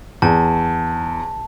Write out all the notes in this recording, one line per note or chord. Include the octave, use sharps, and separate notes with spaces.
E2 A5